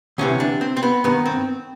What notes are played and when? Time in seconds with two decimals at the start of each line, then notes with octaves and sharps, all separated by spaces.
0.18 D2 C3 E3 C#4
0.40 D4
0.61 C4
0.77 C4
0.83 B3
1.04 G2 D#3 B3
1.25 C4